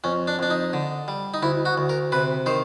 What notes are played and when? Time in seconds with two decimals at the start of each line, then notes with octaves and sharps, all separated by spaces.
0.04 F2 C#4
0.27 D4
0.39 F2 D4
0.50 D#4
0.73 D3
1.08 G3
1.34 D#4
1.42 D2 E4
1.65 F#4
1.78 D2
1.89 A#4
2.12 C3 B4
2.46 D#3 C5